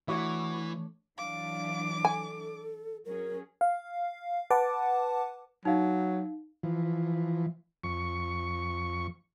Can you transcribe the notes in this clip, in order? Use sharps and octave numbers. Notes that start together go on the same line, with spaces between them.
E3 A3 D4 E4 F#4 C#5 E5
E3 F#3 D4 F5 D6
A4 G#5
F#3 C#4 G#4 A#4
F5
B4 F#5 A5 D6
F#3 D#4 F5
E3 F3
F2 C#6